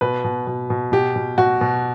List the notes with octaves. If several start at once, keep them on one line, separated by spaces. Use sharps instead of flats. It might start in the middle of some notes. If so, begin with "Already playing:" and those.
B2 B4
B2
B2
B2
B2 G4
B2
B2 F#4
B2